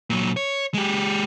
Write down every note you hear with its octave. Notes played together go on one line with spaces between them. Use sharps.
A#2 F#3
C#5
G#3 G4